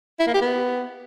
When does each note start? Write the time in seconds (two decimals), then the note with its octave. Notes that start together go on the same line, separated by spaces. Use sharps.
0.19 E4
0.27 A#3
0.34 G4
0.41 B3